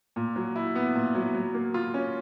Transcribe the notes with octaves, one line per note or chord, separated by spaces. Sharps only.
A#2
F#3
E4
B3
A#2
F#3
F#3
A#3
F4
C#4